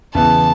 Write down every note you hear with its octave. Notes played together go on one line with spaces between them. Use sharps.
E2 C#3 E3 B3 A5